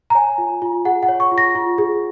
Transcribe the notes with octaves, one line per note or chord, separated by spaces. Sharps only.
A#5
C#5 G#5
F4
F4
G#4 F#5
F#5
C#5
C#6
F4
A#6
F4
G#4